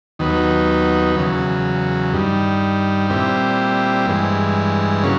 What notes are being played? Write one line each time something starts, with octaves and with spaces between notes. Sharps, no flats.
D#2 D#3 F#3 B3
E2 C#3 F#3
G2 D#3 G3
A#2 G3 C4 E4 G4
G2 E3 G#3
C#3 F#3 A#3 C#4